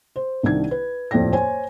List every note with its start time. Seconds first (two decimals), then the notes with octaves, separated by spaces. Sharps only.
0.16 C5
0.43 C2 D#3 D4 G#6
0.71 B4
1.11 D#1 F2 A2 D5 G5 A#6
1.33 C5 C#5 G#5